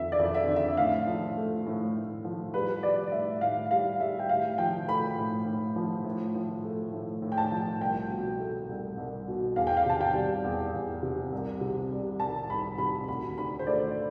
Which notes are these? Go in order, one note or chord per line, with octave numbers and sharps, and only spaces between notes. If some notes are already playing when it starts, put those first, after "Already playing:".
Already playing: F2 D3 E5
D5
F2
E5
D3
E5
A2 F5
F3
A3
A2
A2
F3
G3 B4
G3 D5
A2 E5
A2 F5
G3 F5
G3 E5
G5
A2 F5
F3 G5
A3 B5
A2
A2
F3
A2
F3
A3
A2
A2
G5
A5
F3
C2 G5
B2
A3
C2
C2
B2
E2 F5
G5
F5
C3 A5
G5
G3
E2
E2
C3
C2
C3
G3
C2 A5
C2 B5
C3 B5
D2 B5
D3 B5
C5
A3 D5